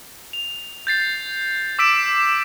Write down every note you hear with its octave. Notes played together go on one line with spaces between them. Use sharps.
F7
G6 A6 C7
D6 E6 B6 D7 E7